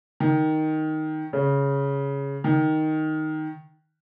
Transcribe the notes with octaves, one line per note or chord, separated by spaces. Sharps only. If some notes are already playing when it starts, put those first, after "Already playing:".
D#3
C#3
D#3